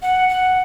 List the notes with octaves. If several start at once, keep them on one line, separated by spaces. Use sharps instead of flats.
F#5
F#5